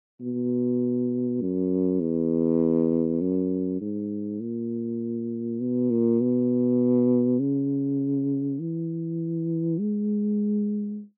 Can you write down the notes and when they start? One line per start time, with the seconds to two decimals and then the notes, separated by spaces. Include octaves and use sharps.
0.21 B2
1.42 F#2
2.00 E2
3.21 F#2
3.81 G#2
4.41 A#2
5.60 B2
5.91 A#2
6.21 B2
7.39 C#3
8.60 E3
9.80 G#3